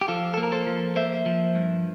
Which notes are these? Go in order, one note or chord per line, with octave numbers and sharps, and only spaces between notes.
G4
F3 F4 A4
A#3 A4
A#4
A4 C5
F3
A#3 C5 E5
F3
G2